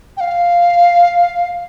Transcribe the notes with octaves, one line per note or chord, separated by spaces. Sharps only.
G5
F5